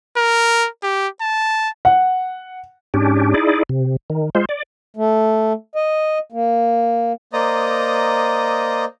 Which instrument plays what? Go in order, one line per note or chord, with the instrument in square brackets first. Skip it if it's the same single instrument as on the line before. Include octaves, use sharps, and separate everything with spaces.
[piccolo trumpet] A#4
G4
A5
[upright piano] F#5
[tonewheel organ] G#2 C#4 D4 G4
D#4 E4 G#4 D5
C3
D#3
G#3 F4 C5
D5
[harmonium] A3
D#5
A#3
[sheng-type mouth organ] A#3 C5 D5 D#5 A#5 D#6